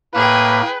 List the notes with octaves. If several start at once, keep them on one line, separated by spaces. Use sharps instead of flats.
A2 A#3 G#4 B4 G5